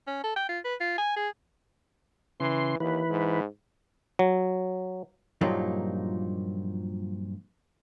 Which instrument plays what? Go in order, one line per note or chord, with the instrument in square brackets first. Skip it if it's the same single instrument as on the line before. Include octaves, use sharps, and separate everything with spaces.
[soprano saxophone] C#4
A4
G5
F4
B4
F4
G#5
G#4
[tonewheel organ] C#3 C6 [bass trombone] E3
[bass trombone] D#2 [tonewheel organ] E3 B4
[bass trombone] G#2
[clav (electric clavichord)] F#3
[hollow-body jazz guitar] G2 A#2 F3 F#3 A#3 D#4